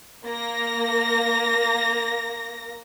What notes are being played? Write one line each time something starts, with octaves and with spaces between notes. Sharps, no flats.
A#3 A#6